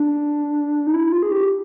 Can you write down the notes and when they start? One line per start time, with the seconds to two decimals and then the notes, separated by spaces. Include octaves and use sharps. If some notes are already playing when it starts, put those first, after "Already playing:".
Already playing: D4
0.87 D#4
0.94 E4
1.12 F4
1.23 G#4
1.31 G4